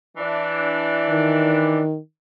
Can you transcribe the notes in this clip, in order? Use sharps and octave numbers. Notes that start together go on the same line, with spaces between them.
E3 D4
D#3